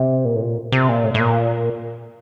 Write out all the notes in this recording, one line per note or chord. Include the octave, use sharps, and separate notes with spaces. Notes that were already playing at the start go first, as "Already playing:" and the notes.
Already playing: C3
A#2
A2
A#2
C3
A#2
A2
A2
A#2